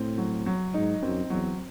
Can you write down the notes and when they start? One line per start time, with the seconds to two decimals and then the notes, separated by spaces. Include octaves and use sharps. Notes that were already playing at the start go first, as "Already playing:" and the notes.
Already playing: A2 C4
0.18 F#3
0.46 F#3
0.74 G#2 D#4
1.02 F#2 C4
1.30 E2 F#3